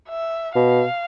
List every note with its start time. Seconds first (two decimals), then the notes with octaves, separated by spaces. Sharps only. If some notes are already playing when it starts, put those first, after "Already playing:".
0.09 E5
0.55 B2 F5